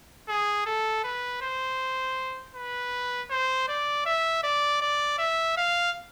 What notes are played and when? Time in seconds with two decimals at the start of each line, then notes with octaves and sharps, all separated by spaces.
0.28 G#4
0.66 A4
1.04 B4
1.42 C5
2.55 B4
3.31 C5
3.68 D5
4.06 E5
4.44 D5
4.81 D5
5.19 E5
5.57 F5